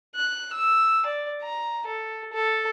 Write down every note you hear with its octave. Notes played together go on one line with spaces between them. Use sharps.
F#6
E6
D5
A#5
A4
A4